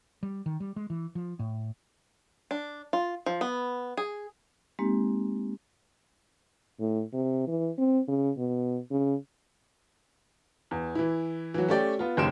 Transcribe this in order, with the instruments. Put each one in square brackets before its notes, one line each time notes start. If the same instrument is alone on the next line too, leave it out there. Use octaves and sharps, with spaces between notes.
[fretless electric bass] G3
D#3
G3
G#3
E3
F3
A2
[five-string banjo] D4
F4
F3
B3
G#4
[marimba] G#3 A#3 C4 D#4 G4
[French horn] A2
C3
E3
C4
C#3
B2
C#3
[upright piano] E2
E3 E4
E3 F#3
A3 C#4 G4 D5 G5
B3 F4
F#1 D#2 C#3 C6 D7 E7